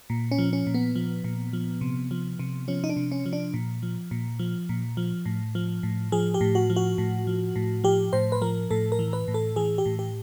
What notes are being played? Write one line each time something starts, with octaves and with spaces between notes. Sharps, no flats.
A#2
C#4
F3
C#4
A#2
B3
F3
A#2
F3
C3
F3
C3
F3 C#4
D#4
D4
C3
C#4
F3
D4
A#2
F3
A#2
F3
A#2
F3
A2
F3
A2
F3 G#4
G4
A2
F#4
F3
F#4
A2
F3
A2
F3 G4
A2 C5
B4
F3 A#4
A2 A4
A#4
E3
B4
A2
A4
E3 G#4
G4
A2
G4